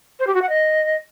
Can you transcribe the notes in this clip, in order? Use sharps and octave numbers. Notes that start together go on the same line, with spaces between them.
C5
G4
F#4
F#5
D#5